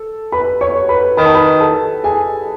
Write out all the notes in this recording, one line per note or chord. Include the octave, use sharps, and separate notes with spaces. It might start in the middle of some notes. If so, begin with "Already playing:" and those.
Already playing: A4
B4 B5
C#5 C#6
B4 B5
D#3 B5
A5
B4 B5
A4 A5
G#4 G#5